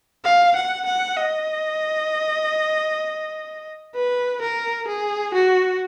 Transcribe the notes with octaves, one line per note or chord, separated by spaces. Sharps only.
F5
F#5
F#5
D#5
B4
A#4
G#4
F#4